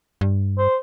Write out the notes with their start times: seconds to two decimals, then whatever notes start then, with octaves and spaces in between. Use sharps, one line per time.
0.21 G2
0.58 C5